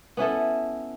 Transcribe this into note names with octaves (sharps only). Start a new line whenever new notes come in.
B3 C#4 E4 A4